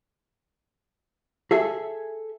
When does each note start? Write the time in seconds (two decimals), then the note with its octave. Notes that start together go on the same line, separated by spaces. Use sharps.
1.51 G#4 A4 E5